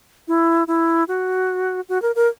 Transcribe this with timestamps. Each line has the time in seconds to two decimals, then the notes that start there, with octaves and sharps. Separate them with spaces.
0.28 E4
0.68 E4
1.08 F#4
1.89 F#4
2.02 A#4
2.15 A#4